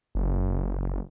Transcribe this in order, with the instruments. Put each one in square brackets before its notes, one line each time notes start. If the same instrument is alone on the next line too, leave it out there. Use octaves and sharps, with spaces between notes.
[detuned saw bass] F#1